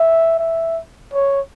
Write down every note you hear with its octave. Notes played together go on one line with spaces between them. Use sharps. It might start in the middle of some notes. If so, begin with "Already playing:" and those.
Already playing: E5
E5
C#5